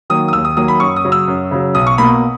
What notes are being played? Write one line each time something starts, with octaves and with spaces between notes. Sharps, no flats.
D#3 F#3 A#3 D#6
D#6
D#2 E6
D#6
D#3 F#3 A#3 D#6
B5
F#2 C#6
D#6
C#3 F#3
E6
F#2
C#3 F#3
B1 D#6
C#6
B2 A#3 B5